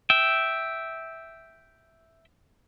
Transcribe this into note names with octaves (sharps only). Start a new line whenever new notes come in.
E5 G5